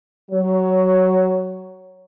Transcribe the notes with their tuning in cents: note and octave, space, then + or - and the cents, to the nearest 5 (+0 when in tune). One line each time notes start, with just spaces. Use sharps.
F#3 +15 C#5 +0